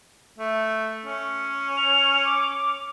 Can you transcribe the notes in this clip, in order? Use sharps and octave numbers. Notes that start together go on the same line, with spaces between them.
A3
C#4
F7
D6